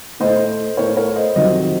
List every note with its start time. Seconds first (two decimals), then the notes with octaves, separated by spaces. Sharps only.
0.20 A2 A3 C5 D#5
0.77 A2 A3 A#4 C#5
0.97 A#4 C#5
1.16 C5 D#5
1.35 F2 C3 D#3 F#3 C5 D#5